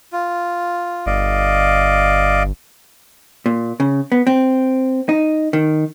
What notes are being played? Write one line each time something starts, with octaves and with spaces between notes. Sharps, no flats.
F4
G1 D5 D#5 F5
A#2
C#3
B3
C4
D#4
D#3